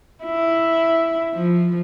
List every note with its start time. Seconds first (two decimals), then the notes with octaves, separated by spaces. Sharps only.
0.24 E4
1.34 F3